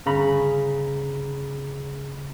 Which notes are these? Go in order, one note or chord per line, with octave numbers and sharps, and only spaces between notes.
G1 C#3 A#5 B5